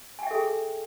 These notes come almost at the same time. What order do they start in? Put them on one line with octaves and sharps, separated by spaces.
G#5 G5 E5 A4 G#4